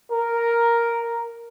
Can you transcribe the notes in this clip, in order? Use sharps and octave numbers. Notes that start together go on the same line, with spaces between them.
A#4